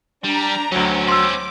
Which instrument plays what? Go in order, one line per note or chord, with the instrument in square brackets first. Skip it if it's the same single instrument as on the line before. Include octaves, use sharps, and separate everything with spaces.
[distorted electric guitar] G3 [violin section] D4 A#5
[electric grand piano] D2 F#3 [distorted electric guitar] C4 C#4
[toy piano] C6 E6 [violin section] D6